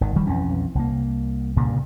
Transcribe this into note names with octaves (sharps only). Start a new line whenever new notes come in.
G#1 D#3
E1 D#3 G3
B1 F2 E3 C#4
C2 A#3
C2 G2 A#2 C#3